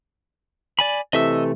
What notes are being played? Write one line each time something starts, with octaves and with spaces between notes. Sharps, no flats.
D5 G#5 B5
C3 E3 A3 D#5 E5 E6